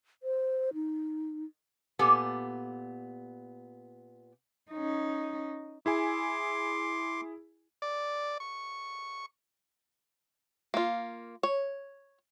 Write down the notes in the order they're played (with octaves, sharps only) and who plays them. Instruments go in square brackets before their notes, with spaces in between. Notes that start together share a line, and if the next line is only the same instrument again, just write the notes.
[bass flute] C5
D#4
[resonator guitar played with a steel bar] A#2 B3 G4 A4 G#5
[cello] C#4 D#4
[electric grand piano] E4 G#4 G#5 [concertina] C6 D6
[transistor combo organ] D5
C#6
[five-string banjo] A#3 F4
C#5